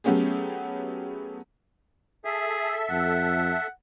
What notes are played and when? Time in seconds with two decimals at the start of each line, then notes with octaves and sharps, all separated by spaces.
0.04 F#3 A3 B3 C#4 G4 G#4
2.25 G#4 A4 E5
2.90 F2 F#5